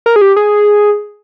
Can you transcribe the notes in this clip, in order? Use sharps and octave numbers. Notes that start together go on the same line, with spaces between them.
A#4
G#4
G4
G#4